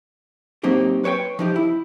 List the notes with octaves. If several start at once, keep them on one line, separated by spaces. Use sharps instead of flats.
F#3 A#3 C4 D#4 G4
B4 C#5 E5 G5 C6
F3 D#4 G4
E4